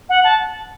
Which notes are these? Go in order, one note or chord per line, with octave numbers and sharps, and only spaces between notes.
F#5
A5